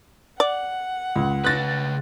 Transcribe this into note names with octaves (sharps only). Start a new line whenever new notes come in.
D5 F#5
C#2
C#3 B4 F#6 A6 A#6